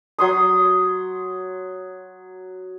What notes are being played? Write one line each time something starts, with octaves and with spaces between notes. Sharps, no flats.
F#3 C6 D#6